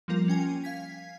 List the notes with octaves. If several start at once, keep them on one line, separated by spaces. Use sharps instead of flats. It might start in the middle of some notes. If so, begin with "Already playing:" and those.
F3 G3 A#3 F4 A#4
C#4 G5 G#5
F5 G#6 B6